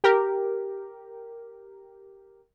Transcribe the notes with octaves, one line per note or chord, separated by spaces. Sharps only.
G4 A#4